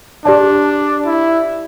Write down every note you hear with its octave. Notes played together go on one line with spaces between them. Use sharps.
D4 G4 D5 A5
E4